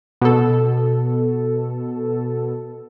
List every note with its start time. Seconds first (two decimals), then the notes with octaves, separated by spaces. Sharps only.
0.21 B2 A4